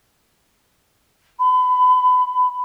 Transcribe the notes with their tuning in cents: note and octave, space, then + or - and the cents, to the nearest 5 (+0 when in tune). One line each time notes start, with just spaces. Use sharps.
B5 +25